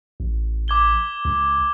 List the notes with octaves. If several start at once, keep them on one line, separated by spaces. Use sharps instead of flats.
A1
D6 G#6 G7
C#2